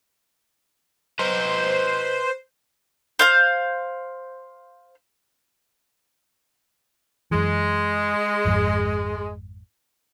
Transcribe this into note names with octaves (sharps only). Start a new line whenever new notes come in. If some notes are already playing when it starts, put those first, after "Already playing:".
B4 C5 D#5 A#5
C5 F5 G6
F#2 E3 G#3
G#1 F2 G#2